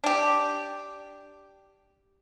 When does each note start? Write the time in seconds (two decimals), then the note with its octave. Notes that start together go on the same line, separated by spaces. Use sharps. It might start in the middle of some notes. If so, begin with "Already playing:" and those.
0.04 D4 G4